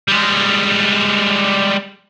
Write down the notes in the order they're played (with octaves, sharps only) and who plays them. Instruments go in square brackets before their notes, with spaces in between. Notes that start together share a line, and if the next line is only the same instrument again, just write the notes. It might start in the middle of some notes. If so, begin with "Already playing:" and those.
[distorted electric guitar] G3 G#3